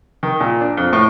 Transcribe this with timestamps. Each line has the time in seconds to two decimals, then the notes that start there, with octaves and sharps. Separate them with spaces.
0.23 D#3
0.40 A#2
0.61 D4
0.77 F2
0.93 A2